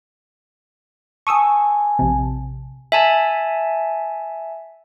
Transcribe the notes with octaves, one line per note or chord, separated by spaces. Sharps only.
G#5 A5 C#6 D#6 E6
A#1 C3
E5 G#5 A5